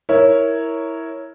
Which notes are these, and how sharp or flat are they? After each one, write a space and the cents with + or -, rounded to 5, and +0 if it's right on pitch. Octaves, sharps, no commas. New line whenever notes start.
E4 -10 A#4 +0 C#5 +0